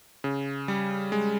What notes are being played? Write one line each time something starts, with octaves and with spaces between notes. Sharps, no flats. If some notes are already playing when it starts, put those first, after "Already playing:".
C#3
G3
G#3